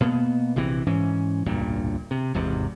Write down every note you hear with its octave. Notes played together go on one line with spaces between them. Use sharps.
B2 A#3 B3
A#1 C3 E3 C4
G#2 E3 C#4
D1 B1 G2 A#2
C3
G#1 E2 G#2 C3